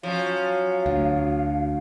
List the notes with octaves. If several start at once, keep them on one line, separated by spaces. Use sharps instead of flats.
F3 F#3 C#4 F5
D2